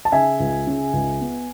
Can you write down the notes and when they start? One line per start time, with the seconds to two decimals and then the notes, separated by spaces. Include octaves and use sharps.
0.05 A5
0.12 C#3 E5 G#5
0.40 C#2
0.67 C#3
0.93 C#2
1.21 B3